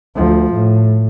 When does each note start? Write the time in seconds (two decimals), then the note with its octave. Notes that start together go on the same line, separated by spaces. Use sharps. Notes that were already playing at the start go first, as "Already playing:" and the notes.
0.15 D2 F3
0.53 A2